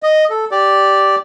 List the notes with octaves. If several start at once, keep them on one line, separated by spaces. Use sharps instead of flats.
D#5
A4
G4 D5